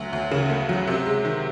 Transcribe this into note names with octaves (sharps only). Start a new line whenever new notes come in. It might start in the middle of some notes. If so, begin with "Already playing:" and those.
Already playing: D2 F#3
D2
C#3
A3
F#3
C3
G#3
D#3